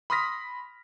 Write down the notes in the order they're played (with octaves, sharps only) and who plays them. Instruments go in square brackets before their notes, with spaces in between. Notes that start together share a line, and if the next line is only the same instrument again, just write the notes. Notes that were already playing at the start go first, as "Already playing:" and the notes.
[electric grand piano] B5 C6 D#6 F6 A#6 B6